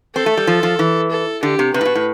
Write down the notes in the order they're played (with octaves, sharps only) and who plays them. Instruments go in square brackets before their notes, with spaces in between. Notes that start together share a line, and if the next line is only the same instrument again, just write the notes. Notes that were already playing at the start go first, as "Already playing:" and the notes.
[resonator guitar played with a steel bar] C4 [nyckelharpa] A4
[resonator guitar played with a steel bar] A3
G3
F3
F3
E3
[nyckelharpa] A4
[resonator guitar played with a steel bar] D3 [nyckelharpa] G4
[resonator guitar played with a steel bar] C3
[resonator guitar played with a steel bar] C3 [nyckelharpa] B4
[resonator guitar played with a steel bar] A2
B2
A2